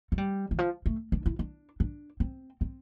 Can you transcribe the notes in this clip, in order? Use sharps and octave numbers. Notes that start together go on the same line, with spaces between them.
A3
G3
E3
F3
A3
D4
E4
D4
D4
C4
C4